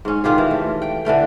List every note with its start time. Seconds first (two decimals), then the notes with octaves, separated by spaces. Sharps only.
0.05 G#2 C#4
0.24 D#3 F4 G4 G#4
0.38 E3
0.51 A3
0.82 G5
1.05 D3 E3 A3 G5